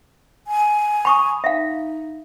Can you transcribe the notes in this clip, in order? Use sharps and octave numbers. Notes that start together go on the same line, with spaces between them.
G#5
B5 C#6 D#6
D#4 E5 F5